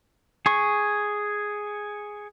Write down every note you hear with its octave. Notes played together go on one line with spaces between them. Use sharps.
G#4 C#6